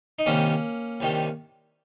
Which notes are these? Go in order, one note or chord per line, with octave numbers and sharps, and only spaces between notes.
D#4
C2 C3 D#3 G3 A#3 C#4
C2 C3 D#3 G3